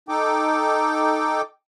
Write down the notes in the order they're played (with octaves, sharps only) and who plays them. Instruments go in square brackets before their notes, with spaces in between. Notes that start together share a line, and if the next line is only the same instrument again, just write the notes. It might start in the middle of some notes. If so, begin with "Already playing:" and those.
[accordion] D#4 A4 G5 D6